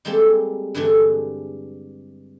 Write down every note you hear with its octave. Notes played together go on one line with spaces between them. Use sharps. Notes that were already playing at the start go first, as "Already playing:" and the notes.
G3 G#3 A#3 C4 G4 A4
G2 D3 E3 G#3 A3